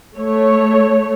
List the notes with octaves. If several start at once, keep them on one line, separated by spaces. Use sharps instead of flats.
A3 C#5